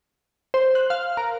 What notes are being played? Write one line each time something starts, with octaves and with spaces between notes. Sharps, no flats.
C5
F#6
F5
A#4